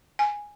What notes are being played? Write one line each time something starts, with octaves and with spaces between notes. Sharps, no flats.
G#5